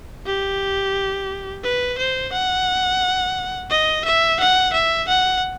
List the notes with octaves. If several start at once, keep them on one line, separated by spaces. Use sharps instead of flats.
G4
B4
C5
F#5
D#5
E5
F#5
E5
F#5